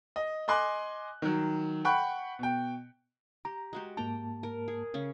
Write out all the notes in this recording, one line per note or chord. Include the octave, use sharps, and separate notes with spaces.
D#5
D#5 G#5 C6 D6 F#6
D#3 F#3
F#5 G5 B5 C#6 F#6
B2 G5
G4 A#5
G#3 F#4 G4
G#2 A#3 G5 A5 A#5
A#4
G#4
C#3 C#4